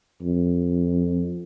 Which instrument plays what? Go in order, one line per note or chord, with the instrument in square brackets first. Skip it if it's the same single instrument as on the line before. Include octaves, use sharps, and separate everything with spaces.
[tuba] F2